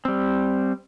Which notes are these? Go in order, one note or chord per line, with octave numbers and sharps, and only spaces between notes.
G3 C4